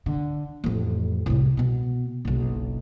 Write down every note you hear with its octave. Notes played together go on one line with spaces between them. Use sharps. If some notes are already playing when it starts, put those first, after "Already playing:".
D3
A1 F2
C2 A2
B2 B3
F#1 B1